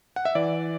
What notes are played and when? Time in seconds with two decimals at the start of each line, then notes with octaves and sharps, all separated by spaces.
0.16 F#5
0.25 E5
0.35 E3 D5